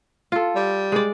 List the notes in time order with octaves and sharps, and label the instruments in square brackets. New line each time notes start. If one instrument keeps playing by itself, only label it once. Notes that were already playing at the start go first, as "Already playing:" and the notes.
[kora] F4 A4
[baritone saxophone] G3
[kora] G#3 D5